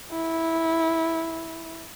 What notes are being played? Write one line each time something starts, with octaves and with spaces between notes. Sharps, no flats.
E4